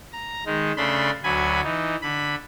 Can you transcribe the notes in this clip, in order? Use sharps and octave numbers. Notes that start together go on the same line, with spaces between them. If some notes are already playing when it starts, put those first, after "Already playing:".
A#5
D#3 G#3 D#4
C#3 A3 D4 B5 C6
D2 F#3 G#5 B5
E3 D#4
D3 B5